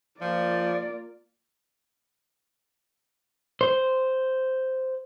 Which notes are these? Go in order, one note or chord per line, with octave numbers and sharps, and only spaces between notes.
F3 A#3 F4 D5
C5